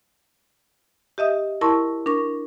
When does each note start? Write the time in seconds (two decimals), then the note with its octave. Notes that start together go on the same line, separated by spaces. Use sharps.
1.18 G4 D#5 E5 D#6
1.61 E4 A#4 A5 C6 C#6
2.06 D4 A#4 C#6